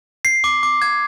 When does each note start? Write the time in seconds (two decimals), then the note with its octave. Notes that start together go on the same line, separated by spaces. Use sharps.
0.25 C7
0.44 D6
0.63 D6
0.82 G#6